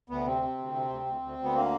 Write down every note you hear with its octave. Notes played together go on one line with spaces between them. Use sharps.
D2 B3
C3 C4
C3
D2
C3
D2
D2
D2
D2
B3
D3 A#3